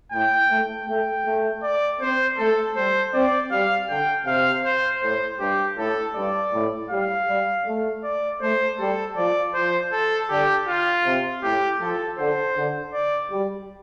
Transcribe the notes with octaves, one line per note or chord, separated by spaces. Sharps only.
A2 G5
A3
A3 G5
A3
D5
C4 C5
A3 A4
G3 C5
C4 D5
G3 F5
D3 G5
C3 F5
C5
A2 C5
G2 G4
A2 A4
G2 D5
A2
G3 F5
G3
A3
D5
A3 C5
G3 A4
F3 D5
F3 C5
A4
D3 G4
F4
C3
A2 G4
F3 A4
D3 C5
D3
D5
G3